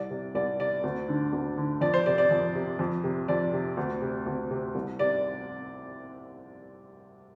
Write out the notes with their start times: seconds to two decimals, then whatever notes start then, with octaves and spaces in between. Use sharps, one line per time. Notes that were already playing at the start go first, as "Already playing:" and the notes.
Already playing: C2 D5
0.10 C3
0.35 C2 D5
0.59 C3 D5
0.84 D2
1.08 D3
1.33 D2
1.57 D3
1.81 F2 D5
1.94 C5
2.06 C3 D5
2.18 D5
2.31 F2
2.55 C3
2.79 F2
3.04 C3
3.28 F2 D5
3.53 C3
3.77 D2
4.02 C3
4.26 D2
4.51 C3
4.75 C2
4.99 C3 D5